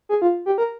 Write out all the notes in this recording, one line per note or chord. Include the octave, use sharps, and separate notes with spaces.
G#4
F4
G4
A#4